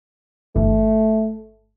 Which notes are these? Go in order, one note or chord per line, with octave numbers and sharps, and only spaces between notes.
G1 E3 A3